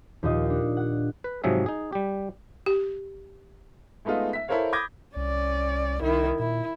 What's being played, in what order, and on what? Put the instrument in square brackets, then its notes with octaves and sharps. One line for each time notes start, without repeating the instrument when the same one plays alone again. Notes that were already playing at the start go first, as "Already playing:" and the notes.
[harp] D#2 A#2 D#4 F4 D#5
D4 D#4
F#5
[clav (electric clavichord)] B4
G#2 C3 F3 F#3 G#4 E5
D#4 G#4
G3 G4
[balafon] G4
[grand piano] G#3 A3 B3 D#4 F4
E5 B6
E4 A4 A#4 C5 C#5 F5
B5 D6 D#6 G6 G#6 A#6
[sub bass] C2 [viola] C#4 D5
[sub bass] C2 [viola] D#3 E4
[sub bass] A#2 [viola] E4